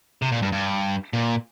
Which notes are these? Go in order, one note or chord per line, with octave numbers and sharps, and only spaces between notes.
C3
A#2
G2
G2
A#2